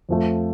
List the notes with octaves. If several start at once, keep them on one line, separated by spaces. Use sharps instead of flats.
F2 F3 A3